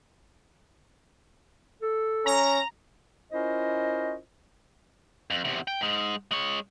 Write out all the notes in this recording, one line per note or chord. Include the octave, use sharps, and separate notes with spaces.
A4
C#4 A#5
C#4 E4 F4 A#4 C5 D#5
F2
E2 C3
G5
G#2 G#3
G#3 C#5